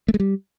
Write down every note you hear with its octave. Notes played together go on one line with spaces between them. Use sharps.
A3
G#3
G3